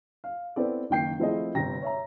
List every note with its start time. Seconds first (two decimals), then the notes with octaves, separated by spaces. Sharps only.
0.24 F5
0.56 B3 C4 E4 A4 B4 D5
0.90 F#1 D#3 A#3 G5 G6 C7
1.20 F3 A3 C4 E4 G#4 D#5
1.55 G1 C3 G5 A#5 A#6
1.82 C#5 E5 A#5